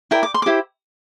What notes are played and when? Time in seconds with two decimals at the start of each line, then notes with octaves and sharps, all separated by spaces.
0.11 E4 A#4 D5 G5
0.23 D6
0.34 C6
0.42 D6
0.46 E4 G4 C5